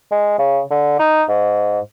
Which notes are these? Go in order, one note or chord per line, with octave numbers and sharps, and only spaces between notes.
G#3
C#3
D3
D#4
G#2